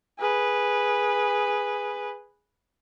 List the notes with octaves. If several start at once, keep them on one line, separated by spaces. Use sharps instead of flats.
G#4 B4